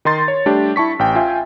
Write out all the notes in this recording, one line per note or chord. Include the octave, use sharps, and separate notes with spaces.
D#3 D#4 C6 A6
C#5
G3 A3 D4 G4
E4 A5 C#6 B6
A1 G5
F4 E5 G5 G#5